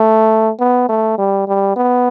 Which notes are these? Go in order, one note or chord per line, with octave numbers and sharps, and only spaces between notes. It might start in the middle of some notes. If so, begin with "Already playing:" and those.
Already playing: A3
B3
A3
G3
G3
B3